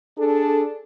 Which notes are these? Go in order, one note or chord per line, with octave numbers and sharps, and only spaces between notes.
D4 G#4 A4